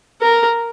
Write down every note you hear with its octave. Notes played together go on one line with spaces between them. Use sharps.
A#4